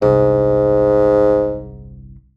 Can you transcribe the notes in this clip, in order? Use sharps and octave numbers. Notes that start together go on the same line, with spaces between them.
G1 C2 G#2